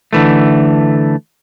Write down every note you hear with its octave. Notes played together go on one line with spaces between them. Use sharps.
D3 E3 A3